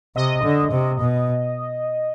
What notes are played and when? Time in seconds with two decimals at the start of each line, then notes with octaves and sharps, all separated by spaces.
0.16 C3 D#5
0.44 D3
0.72 C3
1.00 B2